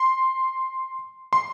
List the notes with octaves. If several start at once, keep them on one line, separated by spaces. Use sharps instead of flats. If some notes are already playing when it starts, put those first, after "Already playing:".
Already playing: C6
C6